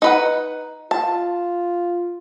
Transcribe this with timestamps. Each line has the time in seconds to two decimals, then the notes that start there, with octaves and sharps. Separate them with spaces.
0.02 D#4 B4 F#5
0.91 F4 A5